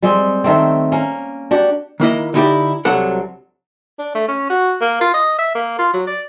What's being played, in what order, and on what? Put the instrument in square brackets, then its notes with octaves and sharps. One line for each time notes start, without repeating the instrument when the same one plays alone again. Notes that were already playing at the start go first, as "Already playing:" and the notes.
[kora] G3 G#3 C4 G4
D#3 A3 C4
A#3 C#4
D4 F#4 G4
[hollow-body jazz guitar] D#3 A#3 E4 D#5
D3 D#4 E4 F#4 G4 D5
C2 C3 F#3 D4 A4 F#5
[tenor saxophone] D4
A3
C#4
F#4
A#3
F4
D#5
E5
A#3
F4
F#3
D5